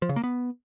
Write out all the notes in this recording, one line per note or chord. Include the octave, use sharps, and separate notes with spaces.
F3
C#3
A#3
B3